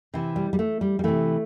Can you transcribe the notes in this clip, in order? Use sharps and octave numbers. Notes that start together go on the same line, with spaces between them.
C3 E3
G3
G3
A3
G3
G3
C3 E3 A3